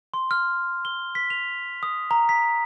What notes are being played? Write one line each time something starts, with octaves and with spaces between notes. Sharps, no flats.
C6
F6
G7
B6
F7
D#6
A#5
B6